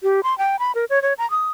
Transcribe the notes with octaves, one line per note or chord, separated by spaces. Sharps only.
G4
C6
G5
B5
A#4
C#5
C#5
A#5
D#6